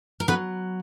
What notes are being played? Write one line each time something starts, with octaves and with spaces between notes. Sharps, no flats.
A#4
F#3 B3 B4